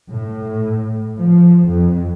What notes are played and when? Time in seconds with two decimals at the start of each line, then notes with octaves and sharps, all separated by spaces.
0.11 A2
1.18 F3
1.67 F2